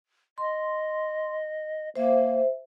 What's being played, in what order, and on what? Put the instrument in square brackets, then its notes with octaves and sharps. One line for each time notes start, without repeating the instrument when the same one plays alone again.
[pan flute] D#5 [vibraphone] C6
[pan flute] A#3 [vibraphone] C5 E5